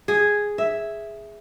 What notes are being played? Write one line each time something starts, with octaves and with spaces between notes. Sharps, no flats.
G#4
E5